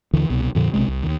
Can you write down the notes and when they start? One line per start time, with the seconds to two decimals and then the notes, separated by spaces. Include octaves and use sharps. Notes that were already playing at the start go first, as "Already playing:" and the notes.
0.13 D#2 D3 E3
0.30 C2 B2
0.55 F2 A#2 D3 F3
0.73 B1 C3 G#3
0.88 C2
1.03 D#2